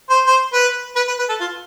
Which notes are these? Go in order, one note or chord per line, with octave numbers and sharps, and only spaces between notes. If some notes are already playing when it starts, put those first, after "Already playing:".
C5
C5
B4
B4
B4
B4
A4
F4